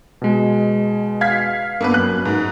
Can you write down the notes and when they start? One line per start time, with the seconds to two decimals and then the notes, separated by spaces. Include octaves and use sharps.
0.22 B2 G#3
1.21 F5 G#6 B6
1.80 G2 A#3 B3 B4
1.94 F#2 F#6
2.25 G#2